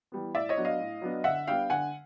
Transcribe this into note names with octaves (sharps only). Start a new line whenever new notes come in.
E3 G3 B3
A2 D5 E5
C#5 D#5
F#3 B3 D4
D#5 F5
A2
F#3 B3 D4
D3 E5 F#5
G3 B3 D4 F5 G5
D3 F#5 G#5